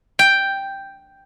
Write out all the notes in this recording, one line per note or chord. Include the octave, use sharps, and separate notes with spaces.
G5